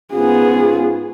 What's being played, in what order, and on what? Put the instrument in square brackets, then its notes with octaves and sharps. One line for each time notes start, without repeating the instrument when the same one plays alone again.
[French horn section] G#2 C#4 F4 [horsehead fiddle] B3 G#4